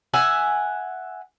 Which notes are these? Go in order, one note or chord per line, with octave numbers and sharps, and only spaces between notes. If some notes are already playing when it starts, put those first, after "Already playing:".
E5 F#5 G#5